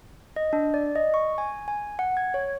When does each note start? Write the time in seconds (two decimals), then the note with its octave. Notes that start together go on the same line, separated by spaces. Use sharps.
0.36 D#5
0.53 D4
0.74 D5
0.95 D#5
1.14 C#6
1.38 G#5
1.68 G#5
1.99 F#5
2.17 G#6
2.34 C#5